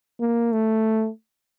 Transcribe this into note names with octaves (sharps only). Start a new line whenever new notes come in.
A#3
A3